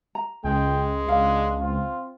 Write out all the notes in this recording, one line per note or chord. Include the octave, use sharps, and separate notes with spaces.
A#5
C#2 G#3 G5
C#2 D4 F5
C4 F4